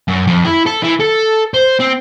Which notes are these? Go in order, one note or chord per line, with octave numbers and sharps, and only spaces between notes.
F#2
F2
E4
A4
E3
A4
C5
C4